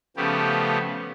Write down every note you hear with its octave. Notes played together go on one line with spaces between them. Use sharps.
C#3 F3 A3 B3 G4